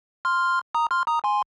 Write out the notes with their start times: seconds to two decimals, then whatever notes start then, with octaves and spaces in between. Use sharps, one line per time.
0.25 C6 F6
0.74 A#5 D#6
0.91 C6 F6
1.07 A#5 D#6
1.24 G#5 C6